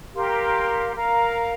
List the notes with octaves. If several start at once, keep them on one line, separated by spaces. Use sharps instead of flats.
G4 A#4 F5 C6
A#4 F5 A#5